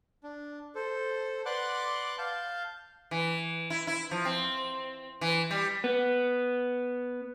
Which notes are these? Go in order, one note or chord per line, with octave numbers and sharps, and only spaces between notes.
D4
A4 C5
B4 D5 F#5 C6 D6 F#6
F5 A5 G6
E3
E4
E4
F3
C4
E3
G3
B3